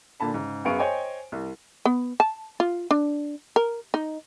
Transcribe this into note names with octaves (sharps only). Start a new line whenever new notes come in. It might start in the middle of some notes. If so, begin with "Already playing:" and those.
A#2 D3 A5 B5
G#2 C#3
F#2 B3 G#4 F5 C#6 D7
C5 C#5 D#5 G5 G#5
C2
B3
A5
F4
D4
A#4
D#4